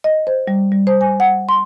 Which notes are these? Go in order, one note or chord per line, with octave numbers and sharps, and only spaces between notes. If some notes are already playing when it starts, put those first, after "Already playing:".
D#5
C5
G3
G3
C5
G#5
F#5
C6